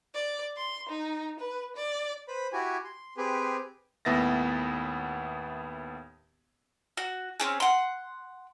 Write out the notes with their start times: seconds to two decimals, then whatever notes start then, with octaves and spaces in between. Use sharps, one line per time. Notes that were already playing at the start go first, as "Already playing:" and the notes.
0.14 D5
0.56 C6
0.89 D#4
1.40 B4
1.76 D5
2.28 B4 C5 B5
2.53 E4 F#4 G4 G#5
2.84 C6
3.17 C4 G4 G#4 B4
4.05 D#2 A2 B3 E5 A6 A#6
6.97 F#4
7.40 C4 C#4 G#4
7.60 F#5 C6